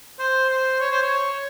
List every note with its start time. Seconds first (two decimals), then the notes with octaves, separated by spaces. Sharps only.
0.19 C5
0.49 C5
0.80 C#5
0.91 C5
1.02 C#5